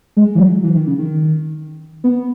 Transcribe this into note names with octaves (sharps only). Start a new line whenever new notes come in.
G#3
E3
F#3
E3
D#3
C#3
D#3
B3